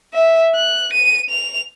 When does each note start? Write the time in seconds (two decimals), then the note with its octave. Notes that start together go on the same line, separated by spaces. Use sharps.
0.14 E5
0.55 F#6
0.93 D#7
1.29 F7